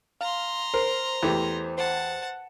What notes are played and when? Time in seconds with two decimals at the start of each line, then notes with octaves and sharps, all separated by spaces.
0.21 F5 A#5 C6
0.74 A#4 C5
1.23 E2 A3 G4
1.78 C5 F#5 A5